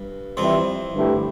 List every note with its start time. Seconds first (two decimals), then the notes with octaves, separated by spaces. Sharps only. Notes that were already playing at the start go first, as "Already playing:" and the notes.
Already playing: G2
0.37 F2 E3 F3 G3 C4 E4
0.93 G2 D3 A3 E4 G4